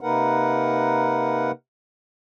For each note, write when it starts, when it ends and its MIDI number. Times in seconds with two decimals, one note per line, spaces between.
0.01 1.51 48
0.01 1.51 58
0.01 1.51 63
0.01 1.51 70
0.01 1.51 71
0.01 1.51 78